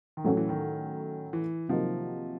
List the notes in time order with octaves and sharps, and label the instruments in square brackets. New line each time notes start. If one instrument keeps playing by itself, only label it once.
[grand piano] D#3
[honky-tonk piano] A2 F#3 A3 C#4 [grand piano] E3
[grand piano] E3
D#3
E3
[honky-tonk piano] C3 D#3 F#3 A#3 D#4 [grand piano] F3